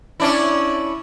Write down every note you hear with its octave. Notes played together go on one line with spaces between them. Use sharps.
C#4 D4 E4